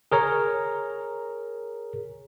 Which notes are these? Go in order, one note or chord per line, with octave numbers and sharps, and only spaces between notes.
G#4 A#4 C#5 A#5